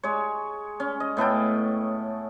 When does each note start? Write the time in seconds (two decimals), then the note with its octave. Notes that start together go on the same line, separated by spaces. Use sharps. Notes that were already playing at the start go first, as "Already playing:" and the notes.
0.03 G#3 C#5
0.80 C#4
1.00 D#5
1.17 A2 B3 A4 G5